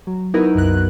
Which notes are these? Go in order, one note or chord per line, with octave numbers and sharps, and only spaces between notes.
F#3
B3 D#4 E4 F#4 A#4 B4
C2 F#2 A#4 F#6